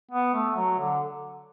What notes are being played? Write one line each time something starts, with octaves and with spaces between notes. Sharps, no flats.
B3
A3
F#3
D3